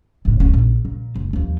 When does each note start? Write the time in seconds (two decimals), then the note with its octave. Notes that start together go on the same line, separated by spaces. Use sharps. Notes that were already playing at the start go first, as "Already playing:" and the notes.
0.25 F#1 A2
0.40 D1 C#4
0.54 A#1
0.85 A#2
1.15 F1
1.33 D#2 F3